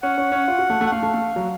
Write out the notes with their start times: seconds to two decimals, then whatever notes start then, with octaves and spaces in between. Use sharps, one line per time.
0.03 C#4 F#5
0.18 C#4
0.32 C#4
0.48 F4
0.58 F#4
0.70 A3
0.81 A3
0.87 F#5
0.92 A3 F5
1.03 A3
1.14 A3
1.36 F#3